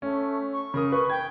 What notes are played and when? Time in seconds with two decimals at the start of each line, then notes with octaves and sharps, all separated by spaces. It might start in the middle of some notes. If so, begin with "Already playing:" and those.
0.02 A3 C#4
0.53 C#6
0.74 C#3 A#4 D#6
0.92 B4
1.10 G5 G#6